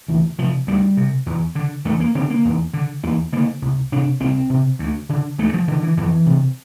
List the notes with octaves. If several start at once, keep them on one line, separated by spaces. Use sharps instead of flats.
D2 E3
C3 F3
D2 G3
C3
E2
D3
E2 A3
A#3
D3 C4
A#3
E2
D3
E2 A#3
D3 A#3
C2
C3 D4
C2 C4
C3
D2
D3
D2 A3
F3
D3 E3
E3
F2 E3
C3